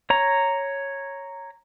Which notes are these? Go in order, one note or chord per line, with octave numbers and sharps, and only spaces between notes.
C#5 A#5